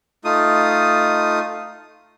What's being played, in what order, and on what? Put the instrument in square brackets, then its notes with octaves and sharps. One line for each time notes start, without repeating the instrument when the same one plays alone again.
[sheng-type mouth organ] A3 D#4 F4 D#6